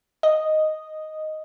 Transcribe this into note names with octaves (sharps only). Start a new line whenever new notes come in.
D#5